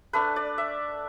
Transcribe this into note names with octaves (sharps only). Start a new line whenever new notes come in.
A3 D4 B4
D5
E5